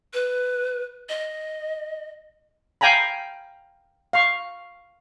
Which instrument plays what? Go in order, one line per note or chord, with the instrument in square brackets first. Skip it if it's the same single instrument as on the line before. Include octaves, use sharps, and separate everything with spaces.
[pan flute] B4
D#5
[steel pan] F5 G5 G#5 A#5 B5
F5 C#6